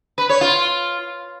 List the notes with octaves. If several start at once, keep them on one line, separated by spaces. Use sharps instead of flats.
B4
C#5
F4